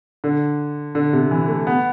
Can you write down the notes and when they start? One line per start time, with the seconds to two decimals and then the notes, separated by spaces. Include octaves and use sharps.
0.24 D3
0.95 D3
1.13 C3
1.31 E3
1.48 A3
1.67 B3